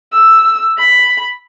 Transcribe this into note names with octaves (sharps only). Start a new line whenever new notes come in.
E6
B5